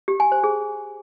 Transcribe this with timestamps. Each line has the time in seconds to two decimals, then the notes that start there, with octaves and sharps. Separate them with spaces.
0.08 G4
0.20 G#5
0.32 C5
0.44 G#4